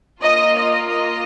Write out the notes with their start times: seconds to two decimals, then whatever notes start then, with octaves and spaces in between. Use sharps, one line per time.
0.21 A#3 F4 D#5
0.56 D#5
0.90 D#5